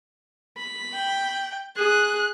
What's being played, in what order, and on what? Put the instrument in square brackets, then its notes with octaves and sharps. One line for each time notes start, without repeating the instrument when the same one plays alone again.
[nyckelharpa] B5
[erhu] G5
[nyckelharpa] G#4 [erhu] F#6